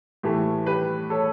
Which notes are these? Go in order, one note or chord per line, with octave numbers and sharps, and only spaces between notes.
A2 E3 A3 G4
G4 B4
A4 C#5